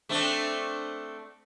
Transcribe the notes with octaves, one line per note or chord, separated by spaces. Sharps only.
A3 C4 D4